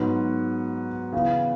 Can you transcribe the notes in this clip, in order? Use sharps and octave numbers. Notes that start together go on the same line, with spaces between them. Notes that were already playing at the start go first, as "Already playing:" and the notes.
Already playing: G#2 F#3 B3 F#4
C#3 E3 B3